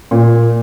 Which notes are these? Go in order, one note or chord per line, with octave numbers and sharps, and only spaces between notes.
A#2